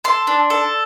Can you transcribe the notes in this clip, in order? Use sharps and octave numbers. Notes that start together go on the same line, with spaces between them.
A4 C6
D4
A4